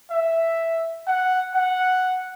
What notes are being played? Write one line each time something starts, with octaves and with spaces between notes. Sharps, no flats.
E5
F#5
F#5